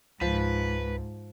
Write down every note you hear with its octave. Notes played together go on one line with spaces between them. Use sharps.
C#2 G#2 F3 B4